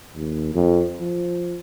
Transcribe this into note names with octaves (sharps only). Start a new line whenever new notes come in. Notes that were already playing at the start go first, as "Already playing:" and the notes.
D#2
F2
F3